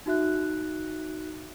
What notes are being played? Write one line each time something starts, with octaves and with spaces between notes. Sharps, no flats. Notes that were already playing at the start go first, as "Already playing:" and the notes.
D#4 F#4 E5 F#6